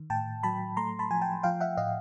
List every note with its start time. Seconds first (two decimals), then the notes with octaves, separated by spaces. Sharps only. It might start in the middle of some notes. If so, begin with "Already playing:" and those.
Already playing: D#3
0.10 A2 G5 A5
0.43 F#3 A5 B5
0.77 A3 A#5 C6
0.99 A5 B5
1.10 F3 G#5
1.22 G5 A5
1.43 F3 F5 G5
1.61 E5 F#5
1.77 A2 D#5 F5